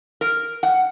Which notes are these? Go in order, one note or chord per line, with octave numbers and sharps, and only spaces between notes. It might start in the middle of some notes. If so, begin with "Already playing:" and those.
A#4
F#5